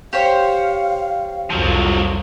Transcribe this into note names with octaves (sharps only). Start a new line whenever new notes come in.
G4 C5 C#5 F5
C2 F2 F3 F#3